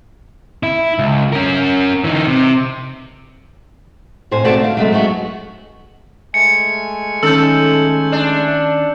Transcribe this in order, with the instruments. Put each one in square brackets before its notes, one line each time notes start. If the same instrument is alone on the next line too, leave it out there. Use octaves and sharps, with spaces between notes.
[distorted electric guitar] E4
C#2
C#4 A#4
E3 D#4
C3
[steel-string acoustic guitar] F2 A2 C5 G#5
C3 A3 F#4 B4 D5 A5
D2 F5
F#3 G#3 A3
F#3 G#3 B3 F#4
[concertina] G#3 A3 G#5 [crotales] C#7
[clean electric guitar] D#3 C#4 D#4 [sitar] A4 [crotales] E6 G6
[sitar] D4